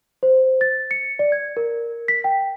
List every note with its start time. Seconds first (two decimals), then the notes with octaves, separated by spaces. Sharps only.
0.23 C5
0.61 A6
0.91 C#7
1.19 D5
1.32 G#6
1.57 A#4
2.08 B6
2.24 G5